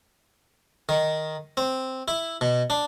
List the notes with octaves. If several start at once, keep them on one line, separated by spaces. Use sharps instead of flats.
D#3
C4
E4
B2
D4